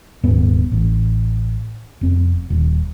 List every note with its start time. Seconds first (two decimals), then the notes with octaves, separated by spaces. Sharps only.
0.23 D#1 G#2 B3
0.72 A1
2.01 F1 C4
2.50 D#1